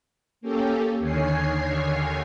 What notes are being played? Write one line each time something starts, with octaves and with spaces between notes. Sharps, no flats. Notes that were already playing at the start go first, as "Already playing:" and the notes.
A#3 C#4 G4 A4
D#2 D3 D#3 C#5 G#5 C7